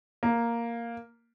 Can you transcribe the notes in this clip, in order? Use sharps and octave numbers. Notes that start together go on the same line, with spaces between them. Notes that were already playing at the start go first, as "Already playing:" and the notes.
A#3